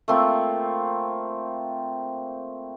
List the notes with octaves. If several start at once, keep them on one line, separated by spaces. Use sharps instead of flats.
A3 A#3 C4 F4